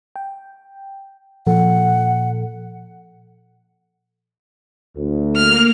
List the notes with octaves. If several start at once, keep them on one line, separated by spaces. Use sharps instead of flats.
G5
A#2 F3 A4 F#5
D2
A#3 F6